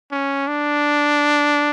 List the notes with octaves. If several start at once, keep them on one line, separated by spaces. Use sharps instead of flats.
C#4
D4